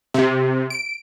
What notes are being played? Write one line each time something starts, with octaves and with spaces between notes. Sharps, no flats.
C3
D7